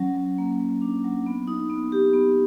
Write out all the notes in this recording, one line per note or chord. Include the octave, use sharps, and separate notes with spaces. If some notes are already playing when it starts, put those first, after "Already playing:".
Already playing: F#3 C#4
F#3
A#3
F#3
D4
F#3
B3
D#4
B3
G4
B3